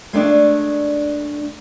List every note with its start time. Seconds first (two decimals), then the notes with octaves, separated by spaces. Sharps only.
0.13 G#3 A3 D4 D5